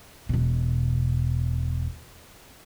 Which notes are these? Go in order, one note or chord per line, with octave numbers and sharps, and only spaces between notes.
E1 B2